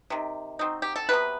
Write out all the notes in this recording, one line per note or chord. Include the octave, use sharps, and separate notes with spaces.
C3 D#3
F#3 C4 D#4
G4
A4
C3 F#3 B3 B4